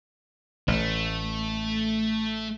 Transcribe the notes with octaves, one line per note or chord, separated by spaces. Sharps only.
A1 A3